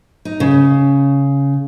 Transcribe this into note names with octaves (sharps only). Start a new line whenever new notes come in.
D#4
C#3